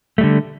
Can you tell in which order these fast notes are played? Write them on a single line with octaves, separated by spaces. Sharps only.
A3 G3 D3